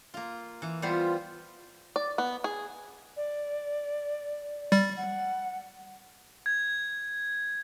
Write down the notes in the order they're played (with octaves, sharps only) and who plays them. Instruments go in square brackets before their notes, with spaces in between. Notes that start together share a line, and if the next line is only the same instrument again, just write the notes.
[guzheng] A#3 F4
E3
[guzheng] G3 B3 C5 [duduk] F4
[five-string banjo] D5
B3
G#4
[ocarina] D5
[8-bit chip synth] G3 A6
[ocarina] F#5
[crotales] G#6